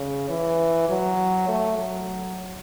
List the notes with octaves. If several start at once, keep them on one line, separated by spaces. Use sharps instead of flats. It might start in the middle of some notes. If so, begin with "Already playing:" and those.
Already playing: C#3
E3
F#3
A3
F#3